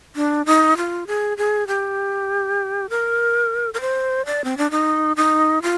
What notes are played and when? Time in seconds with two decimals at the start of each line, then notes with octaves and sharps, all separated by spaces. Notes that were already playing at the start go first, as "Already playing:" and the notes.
0.16 D4
0.46 D#4
0.77 F4
1.07 G#4
1.38 G#4
1.68 G4
2.90 A#4
3.74 A#4
3.81 C5
4.26 D5
4.44 C4
4.58 D4
4.71 D#4
5.17 D#4
5.62 F4